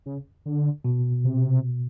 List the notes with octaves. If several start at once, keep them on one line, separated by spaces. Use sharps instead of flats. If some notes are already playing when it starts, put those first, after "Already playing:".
C#3
D3
B2
C3